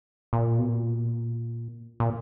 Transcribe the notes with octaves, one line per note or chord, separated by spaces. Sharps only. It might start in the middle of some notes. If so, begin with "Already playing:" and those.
A#2
B2
A#2
A#2